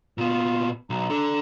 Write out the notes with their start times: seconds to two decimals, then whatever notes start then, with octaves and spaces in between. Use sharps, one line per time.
0.18 A#2 B3 F4
0.90 B1 A#5
1.10 D4 A4